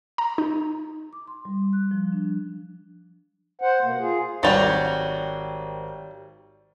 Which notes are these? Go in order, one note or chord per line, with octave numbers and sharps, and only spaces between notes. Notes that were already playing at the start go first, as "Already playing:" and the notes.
A#5
D#4
D6
C6
G3
F#6
F3
D4
C5 F#5
B2 A#3
F4 G#4
G#1 F#3 G3 F#4 A6 F7